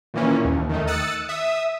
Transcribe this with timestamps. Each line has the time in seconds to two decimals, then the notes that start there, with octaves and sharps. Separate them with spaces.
0.14 A#2 D#3 E3 A#3 C#4
0.45 D#2
0.69 D#3 A3 D#4
0.87 D#6 E6 F#6 A6 C#7
1.29 E5 D#6